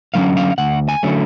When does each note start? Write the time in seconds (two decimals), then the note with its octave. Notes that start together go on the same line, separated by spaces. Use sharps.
0.14 D3 F#3 A3 C#4 F5
0.37 F5
0.58 D2 F#5
0.89 G#5
1.03 D3 F#3 A3 C#4